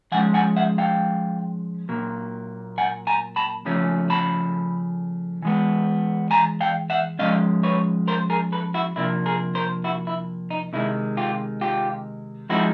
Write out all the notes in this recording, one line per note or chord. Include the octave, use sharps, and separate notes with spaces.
F3 G#3 C#4 F#5 G#5
F#5 G#5
E5 F#5
F5 G5
A#2 F#3 A#3
F#5 G#5
G#5 A#5
A5 B5
C#3 F3 A3 C#4
A5 B5
E3 G#3 B3
G#5 A#5
F5 G5
E5 F#5
F3 G#3 C#4 D#5 F5
B4 C#5
A#4 C5
G#4 A#4
A4 B4
E4 F#4
C3 F3 A#3 D4 E4
G#4 A#4
A#4 C5
E4 F#4
E4
D#4
C3 D#3 G#3 E4
F4 G4
F4 G4
F3 G#3 C4 D#4 E4 F#4